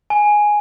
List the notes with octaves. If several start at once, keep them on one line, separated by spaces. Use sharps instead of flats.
G#5